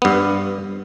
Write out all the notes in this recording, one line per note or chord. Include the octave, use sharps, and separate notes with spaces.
G2 B3